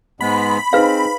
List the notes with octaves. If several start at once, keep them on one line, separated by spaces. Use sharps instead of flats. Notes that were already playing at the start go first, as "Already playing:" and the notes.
G#2 G#3 B3 B5
C4 D#4 G#4 B4 C5 F5